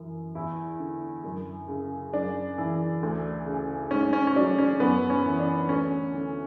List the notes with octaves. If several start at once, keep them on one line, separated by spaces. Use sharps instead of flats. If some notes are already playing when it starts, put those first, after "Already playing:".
Already playing: F#2 E3
E2 E4
D3
F#2
C#3
F#2 D4
E3
D2
C#3
G#2 C#4
C#4
C#4
F#3 D4
C#4
F#2 B3
C#4
E3
D4
D2 C#4
D3